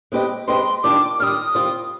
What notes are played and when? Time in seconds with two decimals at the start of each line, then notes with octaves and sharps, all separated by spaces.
0.12 G#3 C4 G4 B4 D#5
0.48 G#3 C4 G4 B4 D#5 C6
0.84 D#3 G3 D4 F4 D6
1.19 D#3 G3 D4 F4 D#6 F6
1.55 D#3 G3 C4 F4